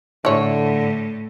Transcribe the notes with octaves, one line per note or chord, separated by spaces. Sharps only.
A2 D3 E4 C#5